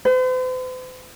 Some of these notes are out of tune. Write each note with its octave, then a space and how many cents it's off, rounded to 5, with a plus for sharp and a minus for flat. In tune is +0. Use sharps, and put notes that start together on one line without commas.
C5 -45